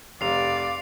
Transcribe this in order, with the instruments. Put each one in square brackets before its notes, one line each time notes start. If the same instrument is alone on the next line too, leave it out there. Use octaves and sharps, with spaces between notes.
[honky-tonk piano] F1 [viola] D5 [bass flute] F5 [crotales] C7 F7